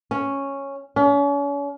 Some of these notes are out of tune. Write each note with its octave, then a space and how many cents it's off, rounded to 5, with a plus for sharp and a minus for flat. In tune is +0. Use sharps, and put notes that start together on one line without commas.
C#4 -5
C#4 +40